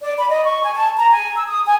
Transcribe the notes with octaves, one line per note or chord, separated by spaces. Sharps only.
D5
B5
D#5
C#6
G#5
A5
A#5
G#5
E6
D#6
G#5